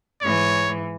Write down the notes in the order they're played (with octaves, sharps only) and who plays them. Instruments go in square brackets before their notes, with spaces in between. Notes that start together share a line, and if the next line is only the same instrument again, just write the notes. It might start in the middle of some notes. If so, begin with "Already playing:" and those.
[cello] G#2 E3 [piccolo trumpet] C#5